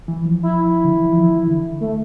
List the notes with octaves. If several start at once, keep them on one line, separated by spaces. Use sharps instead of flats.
E3
F3
E4
D3
E3
F3
E3
D3
A3